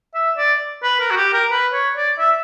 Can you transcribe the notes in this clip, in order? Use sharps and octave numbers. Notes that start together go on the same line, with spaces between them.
E5
D5
B4
A#4
F#4
G4
A#4
B4
C#5
D5
E5